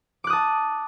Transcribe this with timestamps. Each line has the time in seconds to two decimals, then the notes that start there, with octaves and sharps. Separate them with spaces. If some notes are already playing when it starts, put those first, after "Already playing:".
0.24 D6
0.27 F#6
0.30 D#6
0.33 A5